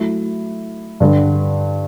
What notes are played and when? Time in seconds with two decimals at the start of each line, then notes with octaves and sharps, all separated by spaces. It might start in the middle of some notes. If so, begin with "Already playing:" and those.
Already playing: F#3 A3 E4
1.00 G2 D3 G3